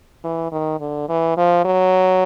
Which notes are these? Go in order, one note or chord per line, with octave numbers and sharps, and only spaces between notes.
E3
D#3
D3
E3
F3
F#3